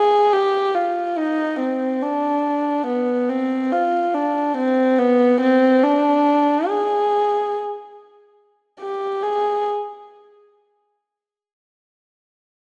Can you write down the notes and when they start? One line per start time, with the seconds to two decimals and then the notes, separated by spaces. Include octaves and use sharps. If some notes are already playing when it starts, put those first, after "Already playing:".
Already playing: G#4
0.33 G4
0.75 F4
1.17 D#4
1.60 C4
2.03 D4
2.87 B3
3.29 C4
3.72 F4
4.14 D4
4.57 C4
4.99 B3
5.41 C4
5.83 D4
6.68 G#4
8.80 G4
9.23 G#4